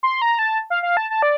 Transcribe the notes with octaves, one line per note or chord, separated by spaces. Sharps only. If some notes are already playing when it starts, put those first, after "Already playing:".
C6
A#5
A5
F5
F5
A5
A5
D5